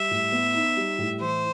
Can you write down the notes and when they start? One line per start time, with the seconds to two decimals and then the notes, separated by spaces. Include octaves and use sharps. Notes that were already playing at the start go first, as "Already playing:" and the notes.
Already playing: G3 E5
0.11 A2
0.32 B3
0.54 D#4
0.77 G3
0.99 A2
1.21 E3 C5